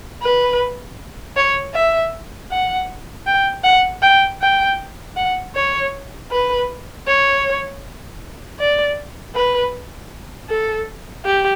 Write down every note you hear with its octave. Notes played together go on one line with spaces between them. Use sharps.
B4
C#5
E5
F#5
G5
F#5
G5
G5
F#5
C#5
B4
C#5
D5
B4
A4
G4